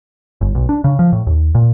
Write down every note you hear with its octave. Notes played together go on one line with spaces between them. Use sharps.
G1
B1
D4
C#3
F3
A2
D#2
A#2